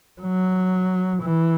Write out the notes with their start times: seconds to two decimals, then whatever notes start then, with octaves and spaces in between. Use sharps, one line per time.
0.22 F#3
1.23 E3